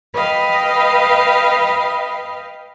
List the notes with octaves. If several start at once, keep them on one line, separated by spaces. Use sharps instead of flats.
B4 D#5 F5 G5